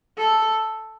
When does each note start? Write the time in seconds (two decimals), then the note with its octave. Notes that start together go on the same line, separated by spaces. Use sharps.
0.18 A4